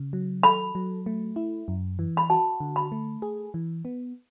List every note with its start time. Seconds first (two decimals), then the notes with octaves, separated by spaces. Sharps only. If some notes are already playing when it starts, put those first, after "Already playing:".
Already playing: C#3
0.13 F#3
0.43 A4 B5
0.75 F#3
1.06 A3
1.36 E4
1.68 F#2
1.99 E3
2.17 B5
2.30 F#4 A5
2.60 D3
2.76 B5
2.92 A3
3.22 G#4
3.54 E3
3.85 B3